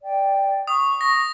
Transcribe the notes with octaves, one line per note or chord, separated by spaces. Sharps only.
D5 G5
C#6 D#6
A#6